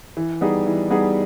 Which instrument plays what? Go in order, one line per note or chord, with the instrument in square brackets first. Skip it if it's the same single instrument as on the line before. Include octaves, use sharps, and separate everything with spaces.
[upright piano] E3
G3 B3 D#4 G#4
E3
G3 B3 D#4 G#4